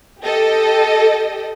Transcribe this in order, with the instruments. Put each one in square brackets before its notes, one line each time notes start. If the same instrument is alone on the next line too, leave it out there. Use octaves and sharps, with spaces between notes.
[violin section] G4 A4 D#5